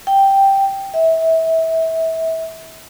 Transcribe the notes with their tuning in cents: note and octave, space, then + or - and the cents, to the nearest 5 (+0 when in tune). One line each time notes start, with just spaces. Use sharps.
G5 +0
E5 -25